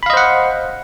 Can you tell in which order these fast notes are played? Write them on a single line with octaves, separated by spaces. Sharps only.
B5 F5 D#5 C5 F#5